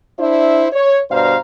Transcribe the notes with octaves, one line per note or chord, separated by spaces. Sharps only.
D4 E4 C5 E5
C#5
G2 B2 C5 D5 F5 A#5